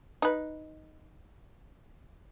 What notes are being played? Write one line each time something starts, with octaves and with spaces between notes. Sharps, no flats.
D#4 B4